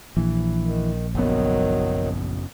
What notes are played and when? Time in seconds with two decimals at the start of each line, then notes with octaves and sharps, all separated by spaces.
0.17 A#1 E3
0.66 D#3
1.15 F#1 D#3 F#3 B3